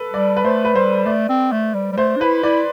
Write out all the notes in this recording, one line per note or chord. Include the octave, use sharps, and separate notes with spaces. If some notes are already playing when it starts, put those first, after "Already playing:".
Already playing: A4 B4
G3 D5
B4
A3 C5
B4
G3 C5
A3 D5
C4
A3
G3
G3
A3 C5
D4
E4 B4
E4 D5